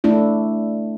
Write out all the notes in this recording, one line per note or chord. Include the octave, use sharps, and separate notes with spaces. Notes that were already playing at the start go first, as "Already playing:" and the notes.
A3 D4 E4